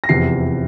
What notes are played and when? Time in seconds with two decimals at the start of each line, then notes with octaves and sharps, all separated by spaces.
0.04 A#6
0.09 F1 E2 C3 F3 C7